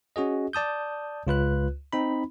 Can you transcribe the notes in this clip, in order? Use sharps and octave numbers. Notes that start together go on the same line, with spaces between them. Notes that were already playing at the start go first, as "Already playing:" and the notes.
C#4 F#4 G#4 D#5
D5 A5 D#6 G6
C#2 F4 B4 F#6
C4 D#4 B5